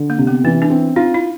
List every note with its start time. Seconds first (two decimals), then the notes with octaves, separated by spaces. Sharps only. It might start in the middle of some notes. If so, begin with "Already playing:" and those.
Already playing: D3
0.10 A#3
0.18 C3
0.27 B3
0.44 E3 C#4
0.62 D4
0.70 C4
0.96 D#4 F4
1.14 E4